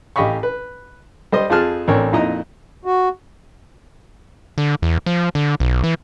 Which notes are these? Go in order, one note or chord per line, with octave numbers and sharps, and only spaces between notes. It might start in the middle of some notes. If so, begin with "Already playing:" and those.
A1 G4 D#5 F5 B5 C#6
B4
G3 C5 D#5
F2 F3 F4 G#4 A5 F6
A1 C4 D4 A#4 C#5
F2 A#2 D#4 E4 D#5 A#5
F#4
D3
E2
F3
D3
B1
E3